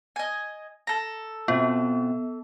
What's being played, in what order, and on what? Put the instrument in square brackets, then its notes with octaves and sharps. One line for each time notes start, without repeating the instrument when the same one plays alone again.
[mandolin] D#5 G#5
A4 A#5
[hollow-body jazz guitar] B2 C4 F4 [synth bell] B3